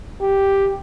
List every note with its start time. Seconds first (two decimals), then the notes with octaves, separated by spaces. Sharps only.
0.21 G4